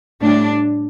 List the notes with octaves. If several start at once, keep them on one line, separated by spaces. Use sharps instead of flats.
A2 G3 D4